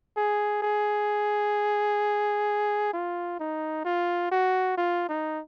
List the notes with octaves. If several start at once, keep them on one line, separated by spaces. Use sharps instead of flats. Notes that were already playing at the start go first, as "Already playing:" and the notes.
G#4
G#4
F4
D#4
F4
F#4
F4
D#4